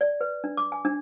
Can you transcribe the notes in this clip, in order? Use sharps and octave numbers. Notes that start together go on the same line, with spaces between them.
D5
B4
D4
D6
G#5
D4